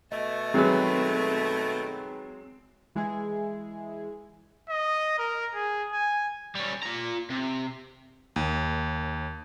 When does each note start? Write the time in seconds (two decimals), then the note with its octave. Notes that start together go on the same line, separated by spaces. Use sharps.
0.12 B2 A3 D#5
0.54 D#3 F#3 G#3 C4 G#4 B4
2.95 E3 G#3 E4 G#4
4.69 D#5
5.19 A#4
5.55 G#4
5.92 G#5
6.55 G3 C#4
6.83 F4 A#5
7.30 C3
8.36 D#2